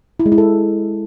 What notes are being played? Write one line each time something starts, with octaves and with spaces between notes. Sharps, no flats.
E4
G#3
E4
A4